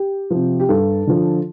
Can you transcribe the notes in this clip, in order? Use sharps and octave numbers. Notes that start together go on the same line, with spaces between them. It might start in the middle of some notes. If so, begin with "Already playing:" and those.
Already playing: G4
C3 F3
G4
G2 A4
D3 F3